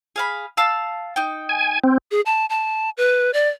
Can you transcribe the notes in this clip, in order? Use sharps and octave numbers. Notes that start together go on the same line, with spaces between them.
G#4 F5 B5
F5 A5 E6
D#4 G5
G#5
C4
G#4
A5
A5
B4
D5